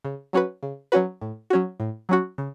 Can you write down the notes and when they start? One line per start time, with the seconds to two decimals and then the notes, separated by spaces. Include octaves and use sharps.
0.05 C#3
0.33 F#3 C#4 F#4 B4
0.63 C#3
0.92 F#3 C#4 F#4 B4
1.21 A2
1.50 F#3 C#4 F#4
1.80 A2
2.09 F#3 C#4 F#4
2.38 C#3